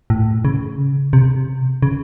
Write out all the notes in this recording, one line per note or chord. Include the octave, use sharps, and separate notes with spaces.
A2
C#3
C3
C#3